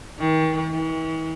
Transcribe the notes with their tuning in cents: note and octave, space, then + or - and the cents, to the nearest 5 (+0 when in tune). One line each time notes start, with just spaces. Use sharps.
D#3 +35
E3 -40